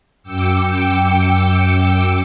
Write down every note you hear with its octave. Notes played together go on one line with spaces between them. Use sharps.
F#2 G5 D6 E6 C#7